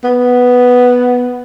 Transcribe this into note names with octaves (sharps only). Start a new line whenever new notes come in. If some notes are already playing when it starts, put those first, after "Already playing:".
B3